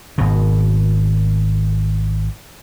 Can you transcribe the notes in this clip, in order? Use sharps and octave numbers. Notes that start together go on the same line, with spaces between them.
G#1 B2